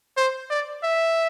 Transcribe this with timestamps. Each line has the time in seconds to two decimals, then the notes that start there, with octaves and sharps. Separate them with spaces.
0.17 C5
0.50 D5
0.83 E5